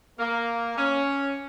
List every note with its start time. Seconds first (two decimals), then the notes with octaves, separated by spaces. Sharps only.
0.19 A#3
0.77 C#4